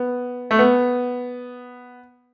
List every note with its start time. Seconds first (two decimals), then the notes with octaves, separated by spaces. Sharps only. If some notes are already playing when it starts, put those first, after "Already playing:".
Already playing: B3
0.51 A3
0.59 B3